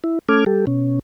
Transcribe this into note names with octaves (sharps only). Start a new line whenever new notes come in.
E4
A3 C#4 A4 D6 F6 G#6
G3 G4 A4
B2 C#4